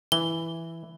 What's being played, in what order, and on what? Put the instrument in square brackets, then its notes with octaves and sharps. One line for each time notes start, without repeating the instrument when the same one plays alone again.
[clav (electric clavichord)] E3 [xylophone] G7